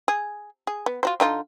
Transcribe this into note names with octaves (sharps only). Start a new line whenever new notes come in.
G#4
G#4
B3
F4 F#4 C5
D3 D#4 F4